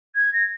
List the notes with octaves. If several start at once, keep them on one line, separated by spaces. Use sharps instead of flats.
G#6
A#6